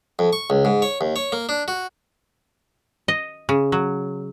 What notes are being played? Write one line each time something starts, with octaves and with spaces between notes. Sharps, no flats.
F2
C#6
C#2
G#2
C#5
D#2
C#5
A#3
D4
F#4
D#5
C#3
F#3